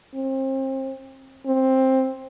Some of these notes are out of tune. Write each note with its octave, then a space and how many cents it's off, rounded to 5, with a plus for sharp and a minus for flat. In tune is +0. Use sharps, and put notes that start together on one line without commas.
C4 +35
C4 +10